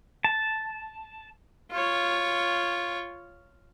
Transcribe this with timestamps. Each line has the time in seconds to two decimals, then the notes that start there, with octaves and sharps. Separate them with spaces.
0.24 A5
1.72 F4 C#5